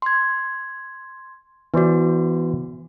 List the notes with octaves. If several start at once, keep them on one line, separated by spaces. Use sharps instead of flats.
C6 G#6
E3 B3 F#4 C5 D5